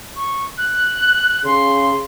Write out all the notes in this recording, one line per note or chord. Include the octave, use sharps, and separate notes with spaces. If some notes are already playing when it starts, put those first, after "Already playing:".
C#6
F#6
C#3 C6